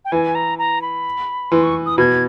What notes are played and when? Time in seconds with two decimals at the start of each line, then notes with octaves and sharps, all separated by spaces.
0.05 G5
0.12 E3 G#5
0.35 A#5
0.59 A#5
0.82 B5
1.51 E3 C6
1.63 C#6
1.86 D#6
1.98 B2 G#6